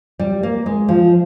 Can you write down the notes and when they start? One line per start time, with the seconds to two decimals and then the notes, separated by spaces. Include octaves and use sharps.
0.19 G3
0.43 A#3
0.66 G#3
0.89 F3